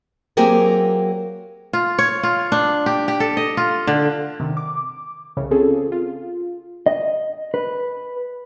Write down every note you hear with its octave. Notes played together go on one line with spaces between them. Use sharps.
F#3 A#3 C4 G4 G#4 A#4
F4
C#5
F4
D4
G4
G4
A4
D#5
F4
D3
C3 D#3
D6
C2 C#3 E3 C#5
C4 C#4 F4 G#4 A4
F4
D#5
B4